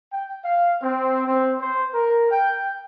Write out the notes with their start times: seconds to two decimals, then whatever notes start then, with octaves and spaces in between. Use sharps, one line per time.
0.11 G5
0.45 F5
0.82 C4
1.27 C4
1.60 C5
1.93 A#4
2.32 G5